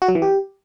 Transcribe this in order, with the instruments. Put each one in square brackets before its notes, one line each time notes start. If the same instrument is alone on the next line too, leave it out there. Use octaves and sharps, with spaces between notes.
[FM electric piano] F#4
F#3
E3
G4